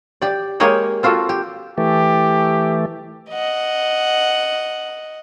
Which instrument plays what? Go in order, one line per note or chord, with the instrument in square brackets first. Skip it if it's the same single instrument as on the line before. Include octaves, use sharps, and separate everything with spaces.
[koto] G4 D5
G#3 A#3 G4 C#5 D#5
C4 F4 F#4 A4
G4
[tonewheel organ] E3 A3 [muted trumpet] G4
[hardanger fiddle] D#5 F#5